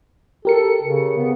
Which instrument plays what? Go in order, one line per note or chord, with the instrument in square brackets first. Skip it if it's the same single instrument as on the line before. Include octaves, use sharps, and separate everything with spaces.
[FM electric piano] G4 A#4 C#7 [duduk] A4
[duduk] C#3
B3